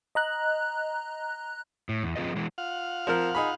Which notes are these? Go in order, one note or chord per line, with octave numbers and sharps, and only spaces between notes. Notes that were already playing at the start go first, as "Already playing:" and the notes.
D#5 A#5 F#6
A2
E2
F3 C4 F4 G#4 B4 D#5
E3 G#3
F4 F5 F#5
F3 C4 A#4
D#4 G#4 B5